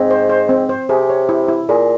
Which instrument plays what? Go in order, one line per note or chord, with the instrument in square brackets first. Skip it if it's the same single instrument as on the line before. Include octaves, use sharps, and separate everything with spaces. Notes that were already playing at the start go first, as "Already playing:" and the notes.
Already playing: [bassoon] G#2 [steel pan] C4
[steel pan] C5
C5
C4
C5
[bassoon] C3 [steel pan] G#4
[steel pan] C#5
E4
E4
[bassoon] A#2 [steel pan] G#4